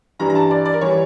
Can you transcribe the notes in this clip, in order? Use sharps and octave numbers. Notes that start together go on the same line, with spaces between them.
G2 E3 G3 A#5
A#5
A5
D5
D5
A#4
E3 G3 C#5